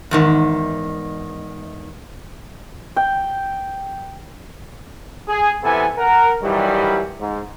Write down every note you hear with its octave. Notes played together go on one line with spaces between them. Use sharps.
E2 G#2 D#3
G5
G#4
C3 E3 B3 A4 G#5
A#4 F#5
D#3 E3 F#3 G3
G#2